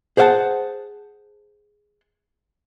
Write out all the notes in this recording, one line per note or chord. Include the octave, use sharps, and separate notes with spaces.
G#4 C5 C#5 F5 F#5 A5